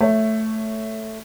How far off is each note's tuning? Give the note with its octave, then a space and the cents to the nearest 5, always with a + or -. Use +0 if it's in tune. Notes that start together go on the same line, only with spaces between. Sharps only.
A3 +0 C#5 +0